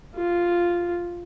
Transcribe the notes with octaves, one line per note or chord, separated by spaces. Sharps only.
F4